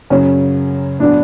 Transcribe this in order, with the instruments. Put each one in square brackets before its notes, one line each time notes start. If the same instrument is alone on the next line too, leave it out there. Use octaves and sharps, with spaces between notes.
[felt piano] F#2 C#3 F#3 [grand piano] C#4
[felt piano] A2 F#3 B3 [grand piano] D4